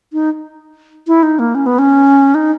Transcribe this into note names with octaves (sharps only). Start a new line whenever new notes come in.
D#4
E4
D#4
A#3
C#4
B3
C#4
D#4